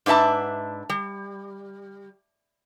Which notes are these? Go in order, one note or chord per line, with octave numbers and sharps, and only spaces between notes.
G#2 D4 B4 E5 A5
G3